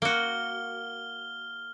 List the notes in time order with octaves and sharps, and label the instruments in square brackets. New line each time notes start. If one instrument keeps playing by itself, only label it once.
[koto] A#3 F#4 [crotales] F6 G7